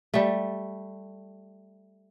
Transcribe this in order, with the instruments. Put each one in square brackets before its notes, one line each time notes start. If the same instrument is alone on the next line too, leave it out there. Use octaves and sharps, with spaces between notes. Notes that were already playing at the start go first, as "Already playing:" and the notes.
[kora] G3 A3